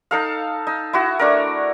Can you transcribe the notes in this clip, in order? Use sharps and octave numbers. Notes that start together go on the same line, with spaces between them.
D#4 A4 F5
D#4
E4 F#4
A3 D4 A#4